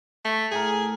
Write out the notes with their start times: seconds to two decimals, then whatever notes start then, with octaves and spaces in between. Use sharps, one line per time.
0.25 A3
0.52 A2 G#4 A#4